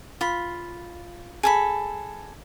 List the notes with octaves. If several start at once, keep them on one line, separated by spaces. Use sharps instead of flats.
F4 B5
G#4 A4 B5